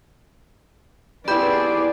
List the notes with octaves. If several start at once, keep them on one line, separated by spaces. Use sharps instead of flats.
B3 E4 G4 G#4 D5 B5 G6